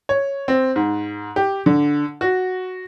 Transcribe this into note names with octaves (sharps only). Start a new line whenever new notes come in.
C#5
C4
G#2
G4
D3
F#4